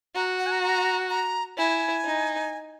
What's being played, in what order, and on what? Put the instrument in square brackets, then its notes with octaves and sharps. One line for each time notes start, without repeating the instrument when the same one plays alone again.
[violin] F#4 [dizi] A#5
[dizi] F#5
G#5
A#5
A#5
A#5
[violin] E4 [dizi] G#5
[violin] D#4